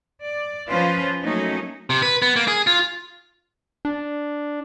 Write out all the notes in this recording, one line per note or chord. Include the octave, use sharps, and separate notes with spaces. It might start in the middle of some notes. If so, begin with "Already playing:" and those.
D5
F3 C#4 F4 B4 C5
F#3 A3 A#3 C#4 D#4
C3
B4
B3
A#3
G#4
F4
D4